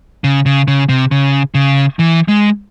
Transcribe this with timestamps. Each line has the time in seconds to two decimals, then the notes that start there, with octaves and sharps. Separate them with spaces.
0.24 C#3
0.46 C#3
0.68 C#3
0.89 C3
1.11 C#3
1.55 C#3
1.99 E3
2.28 G#3